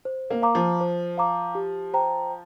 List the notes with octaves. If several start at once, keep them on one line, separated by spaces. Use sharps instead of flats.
C5
A#3
F5 A#5 D6
F3
C5
F5 A#5 D6
G4
C5 G5 A#5